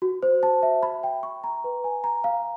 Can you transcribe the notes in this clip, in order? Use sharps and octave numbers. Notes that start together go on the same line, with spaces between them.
F#4
C5
A5
E5
B5
G5
C#6
A#5
B4
G#5
A#5
F5